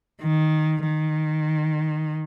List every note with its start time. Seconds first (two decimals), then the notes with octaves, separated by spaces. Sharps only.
0.24 D#3
0.86 D#3